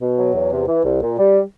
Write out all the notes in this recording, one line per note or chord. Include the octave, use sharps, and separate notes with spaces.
B2
F#3
E2
C3
E3
C2
A#2
G3